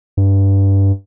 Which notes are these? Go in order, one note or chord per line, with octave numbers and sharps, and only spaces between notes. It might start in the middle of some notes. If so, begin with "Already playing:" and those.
G2